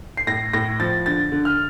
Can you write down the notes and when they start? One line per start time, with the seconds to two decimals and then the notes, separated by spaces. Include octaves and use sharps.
0.17 C7
0.27 A2 A#6
0.53 A2 A#6
0.80 F3 A6
1.06 D3 A6
1.32 D3
1.45 F6